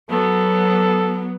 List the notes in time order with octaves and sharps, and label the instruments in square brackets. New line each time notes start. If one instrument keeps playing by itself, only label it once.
[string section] F#3 B3 [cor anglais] A4